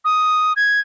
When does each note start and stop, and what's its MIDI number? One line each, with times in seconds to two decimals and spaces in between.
0.05 0.53 87
0.56 0.80 92